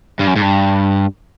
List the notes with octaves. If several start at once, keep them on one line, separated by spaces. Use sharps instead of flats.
G2
F#2
G#2
G2